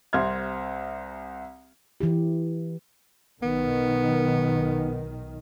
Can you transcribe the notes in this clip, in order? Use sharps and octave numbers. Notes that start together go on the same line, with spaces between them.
C2 C4 E5 C6 F6 G#6
E3 E4 G4
B1 D#3 B3